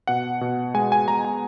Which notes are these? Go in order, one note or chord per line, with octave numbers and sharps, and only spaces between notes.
B2 F#5
B2
G#3 G#5
G#5
G#3 A#5
G#5